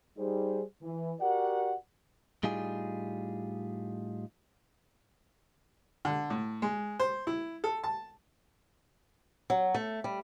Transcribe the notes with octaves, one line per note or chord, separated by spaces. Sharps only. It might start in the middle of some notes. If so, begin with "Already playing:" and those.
G3 D#4 G#4 C5
E3
F#4 G4 A#4 D5 F#5
A2 G3 D#4 F4 G#4
D3
A2
G#3
C5
E4
A4
A5
F#3
A3
G3